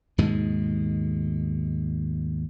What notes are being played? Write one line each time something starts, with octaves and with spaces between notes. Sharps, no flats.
D#2 G#2 B2 G#3